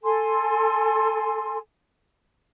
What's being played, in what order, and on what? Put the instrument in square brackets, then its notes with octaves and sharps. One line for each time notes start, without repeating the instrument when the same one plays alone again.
[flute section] A4 G#5 C6